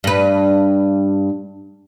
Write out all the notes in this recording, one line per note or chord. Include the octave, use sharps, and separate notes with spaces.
G2 B4